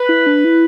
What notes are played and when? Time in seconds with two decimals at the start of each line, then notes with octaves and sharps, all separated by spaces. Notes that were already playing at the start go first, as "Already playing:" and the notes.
Already playing: B4
0.09 E4
0.26 D4
0.44 E4